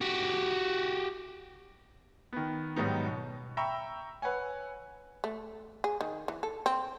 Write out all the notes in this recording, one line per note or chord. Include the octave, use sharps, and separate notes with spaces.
F#4 G4
D#3 B3
G#2 D#3 F#3 G3 B3 D#4
B2
E5 G5 A#5 B5 C#6 E6
B4 C#5 F#5 G#5
A3
G#4
D#3
E3
A4
C4